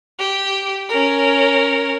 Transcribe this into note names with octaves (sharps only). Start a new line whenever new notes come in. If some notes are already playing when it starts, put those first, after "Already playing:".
G4
C#4 A#4